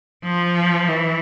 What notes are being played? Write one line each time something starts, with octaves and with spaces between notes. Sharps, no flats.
F3
E3